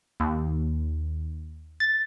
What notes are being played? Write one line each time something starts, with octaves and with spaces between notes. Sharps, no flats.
D#2
A6